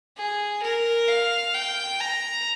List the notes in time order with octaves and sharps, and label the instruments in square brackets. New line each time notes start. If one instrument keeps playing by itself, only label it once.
[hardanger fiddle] G#4
A#4
F5
G5
A#5